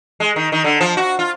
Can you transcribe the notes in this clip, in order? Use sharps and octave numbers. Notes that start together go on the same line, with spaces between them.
G#3
D#3
D#3
D3
F3
F#4
F4